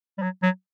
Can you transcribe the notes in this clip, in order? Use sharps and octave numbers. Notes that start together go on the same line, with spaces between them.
G3
F#3
F#3